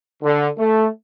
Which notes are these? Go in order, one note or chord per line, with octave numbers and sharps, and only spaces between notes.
D3
A3